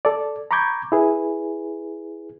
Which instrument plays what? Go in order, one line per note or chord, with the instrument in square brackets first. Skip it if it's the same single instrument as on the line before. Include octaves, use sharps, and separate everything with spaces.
[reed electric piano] A4 D5
A#5 B5 C#6 D6 G6 G#6
E4 G#4 B4